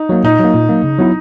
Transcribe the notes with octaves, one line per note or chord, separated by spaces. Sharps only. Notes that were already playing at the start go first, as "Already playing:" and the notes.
Already playing: D#4
F#3 A#3
A#2 D#4
F#3 A#3
A#2
F#3 A#3
C#3
F#3 B3 E4